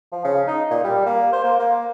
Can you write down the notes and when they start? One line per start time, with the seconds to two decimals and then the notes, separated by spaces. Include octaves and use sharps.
0.12 F3
0.24 C#3
0.47 D#4
0.70 A#2
0.84 G3
1.06 A#3
1.32 C5
1.43 A#3
1.59 A#3